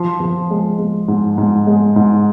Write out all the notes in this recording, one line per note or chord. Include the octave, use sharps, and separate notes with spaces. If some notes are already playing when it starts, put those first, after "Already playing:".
Already playing: F3 C6
F3
G#3
G#3
G#2
G#2
G#3
G#2